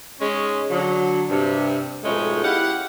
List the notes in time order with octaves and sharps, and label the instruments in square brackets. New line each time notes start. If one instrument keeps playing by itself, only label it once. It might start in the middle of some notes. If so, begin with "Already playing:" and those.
[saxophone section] G#2 G#3 C#4
D3 F#3
G2 C3
F2 G#2 B2 G#3 A3 C#4
E4 G4 F5 F#5